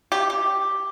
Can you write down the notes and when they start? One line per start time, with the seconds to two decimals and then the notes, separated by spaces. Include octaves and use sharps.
0.12 G4
0.30 G4